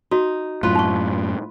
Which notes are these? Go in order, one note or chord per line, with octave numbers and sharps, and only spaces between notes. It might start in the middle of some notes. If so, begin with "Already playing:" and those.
D#4 F#4
F#2 A2 F4 B4
D#4 C#6